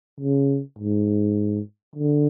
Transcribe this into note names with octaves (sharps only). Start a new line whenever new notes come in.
C#3
G#2
D3